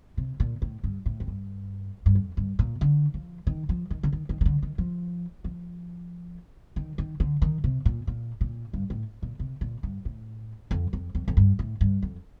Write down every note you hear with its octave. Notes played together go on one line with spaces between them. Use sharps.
C3
A#2
A2
G2
A2
F2
G2
G2
F2
G2
A#2
D3
F3
D#3
F3
D#3
D3
D#3
D#3
D#3
D3
D#3
F3
F3
D#3
D#3
D3
D#3
C3
A#2
A#2
A#2
G2
A2
A#2
C3
A#2
G2
A2
F2
F2
F2
F2
G2
A2
G2
F2